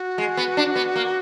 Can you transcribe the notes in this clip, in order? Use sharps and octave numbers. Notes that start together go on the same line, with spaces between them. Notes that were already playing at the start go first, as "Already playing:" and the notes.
Already playing: F#4
G#3
B3
D4
B3
A#3